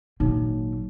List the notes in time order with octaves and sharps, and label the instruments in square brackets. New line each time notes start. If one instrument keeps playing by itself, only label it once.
[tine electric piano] G#1 F#3 [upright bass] A#2 [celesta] D#4